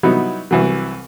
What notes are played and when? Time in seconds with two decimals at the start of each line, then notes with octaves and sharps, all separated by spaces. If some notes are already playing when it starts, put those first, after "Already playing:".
0.03 F#3 G3 B3 D#4 E4
0.51 C2 E3 F#3